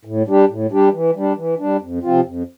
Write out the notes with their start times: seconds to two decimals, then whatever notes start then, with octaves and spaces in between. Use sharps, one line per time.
0.05 A2
0.27 G3 D4 G4
0.49 A2
0.72 G3 D4 G4
0.93 E3
1.15 G3 D4
1.37 E3
1.59 G3 D4
1.81 F2
2.03 C3 F3 C4 F4
2.25 F2